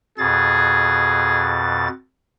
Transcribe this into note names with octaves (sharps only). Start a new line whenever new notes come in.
F2 B2 G#4 A6